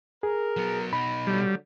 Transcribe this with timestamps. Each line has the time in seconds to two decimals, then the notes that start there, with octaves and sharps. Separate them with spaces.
0.23 G#4 A#4
0.57 F#3 B3
0.93 B2 D#4 B5
1.27 D3 F#3 G3